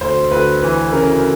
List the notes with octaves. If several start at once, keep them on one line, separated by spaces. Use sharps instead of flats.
D2 C5
D2 B4
E3 B4
C#3 A#4